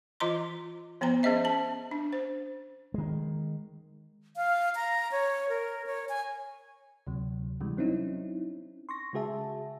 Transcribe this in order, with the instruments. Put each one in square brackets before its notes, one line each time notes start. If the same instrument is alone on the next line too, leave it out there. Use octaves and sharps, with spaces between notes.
[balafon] E3 F4 D#5 A#5 C6
F3 B3 C5 G5 A#5
C#4 G#4 C5 D#5 E5
C#4 A5
D4
C5
[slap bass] D#3 G#3
[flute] F5
A#5
C#5
A#4
C#5
G#5
[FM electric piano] D2 C3 F#3
C3 E3 G3 G#3
F#3 C4 C#4 D#4 E4
C6 C#6 A#6
C#3 G#3 F#4 G#4 E5 A5